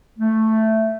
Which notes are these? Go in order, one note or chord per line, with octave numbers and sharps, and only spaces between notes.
A3